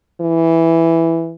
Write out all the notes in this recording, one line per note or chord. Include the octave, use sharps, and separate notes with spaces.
E3